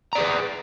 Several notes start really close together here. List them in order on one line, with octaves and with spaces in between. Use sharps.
A#5 D5 G#4 B4